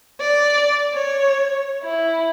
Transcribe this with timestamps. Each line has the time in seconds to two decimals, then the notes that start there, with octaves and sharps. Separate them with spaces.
0.20 D5
0.93 C#5
1.83 E4